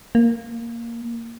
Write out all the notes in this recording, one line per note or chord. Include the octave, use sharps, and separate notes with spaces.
A#3